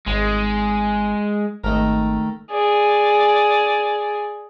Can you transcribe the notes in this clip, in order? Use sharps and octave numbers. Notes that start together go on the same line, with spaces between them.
G#1 G#3
G#1 D#3 A3 A#4
G#4 D5